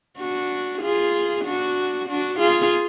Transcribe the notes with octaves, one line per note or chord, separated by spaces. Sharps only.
D4 F#4
F4 G#4
D4 F#4
D4 F#4
F4 G#4